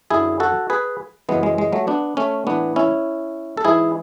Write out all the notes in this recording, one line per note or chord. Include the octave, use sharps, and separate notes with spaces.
F#2 D3 E4 G#4
F#4 A4
G#4 B4
F#2 C#3 E3 G#3 B3
G#3
G#3
F#3 A3
B3 D4
A3 C#4
A2 E3 B3 D4
C#4 E4
A4
G#2 E3 E4 G#4